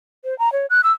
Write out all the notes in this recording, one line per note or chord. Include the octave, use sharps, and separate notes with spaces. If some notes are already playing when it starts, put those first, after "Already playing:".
C5
A#5
C#5
F#6
E6